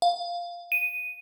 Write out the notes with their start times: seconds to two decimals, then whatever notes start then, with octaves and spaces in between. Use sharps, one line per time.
0.02 F5
0.72 D#7